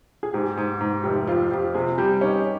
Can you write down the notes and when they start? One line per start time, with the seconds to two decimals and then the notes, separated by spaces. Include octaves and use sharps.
0.23 G#4
0.34 G#2 G4
0.57 G#2
0.81 G#2
1.03 F1 G4
1.27 F2 F4
1.51 F2 G4
1.74 C3 G#4
1.98 G3 G4
2.21 C#4 D#4